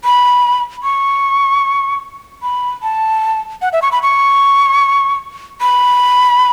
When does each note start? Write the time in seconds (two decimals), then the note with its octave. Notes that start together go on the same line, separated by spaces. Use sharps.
0.04 B5
0.83 C#6
2.43 B5
2.83 A5
3.62 F#5
3.73 E5
3.82 C#6
3.92 B5
4.03 C#6
5.61 B5